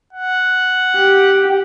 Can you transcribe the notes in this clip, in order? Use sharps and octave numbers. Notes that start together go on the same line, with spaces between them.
F#5
G4